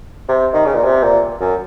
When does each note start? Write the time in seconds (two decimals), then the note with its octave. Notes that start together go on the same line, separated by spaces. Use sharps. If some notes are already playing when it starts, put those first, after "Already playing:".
0.29 C3
0.54 D#3
0.66 C#3
0.75 A#2
0.84 C3
1.03 A#2
1.41 F#2